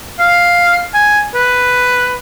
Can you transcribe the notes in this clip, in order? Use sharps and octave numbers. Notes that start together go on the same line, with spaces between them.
F5
G#5
B4